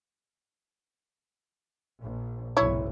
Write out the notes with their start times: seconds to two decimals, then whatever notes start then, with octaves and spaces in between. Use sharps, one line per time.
2.00 A#1
2.57 F#1 B1 G#2 E4 C#5